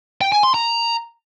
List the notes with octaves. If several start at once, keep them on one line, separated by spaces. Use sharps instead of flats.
G5
G#5
C6
A#5